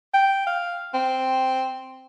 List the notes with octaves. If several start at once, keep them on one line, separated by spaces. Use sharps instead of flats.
G5
F5
C4